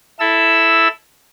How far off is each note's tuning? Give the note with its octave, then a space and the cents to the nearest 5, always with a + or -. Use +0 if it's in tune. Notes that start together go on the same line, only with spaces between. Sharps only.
E4 +0 A4 +0 E6 +0